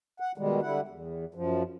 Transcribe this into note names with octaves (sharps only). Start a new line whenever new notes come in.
F#5
B2 D#3 G3 G#3
D3 G3 E4 F#5
E2
F#2 F3